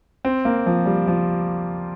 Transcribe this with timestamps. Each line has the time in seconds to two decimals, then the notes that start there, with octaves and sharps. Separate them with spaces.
0.25 C4
0.45 A#3
0.66 F3
0.86 G3
1.07 F3